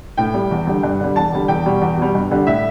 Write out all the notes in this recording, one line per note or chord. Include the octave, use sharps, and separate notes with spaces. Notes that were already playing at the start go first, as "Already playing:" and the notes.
A2 G5
G3
E2
D3 G3
G2
D3 G3
E2 A5
D3 G3
E2 G5
B2 G3
E2
B2 G3
G2
D3 G3
A2 E5